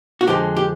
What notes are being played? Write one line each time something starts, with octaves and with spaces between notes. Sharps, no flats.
F#4
F2 D3 F3 G#3 G4
G4